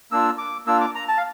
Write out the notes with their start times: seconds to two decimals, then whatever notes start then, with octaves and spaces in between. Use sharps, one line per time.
0.11 A#3 D4 F4 E6
0.38 D6
0.66 A#3 D4 F4 E6
0.81 D6
0.95 A#5
1.08 A5
1.17 F5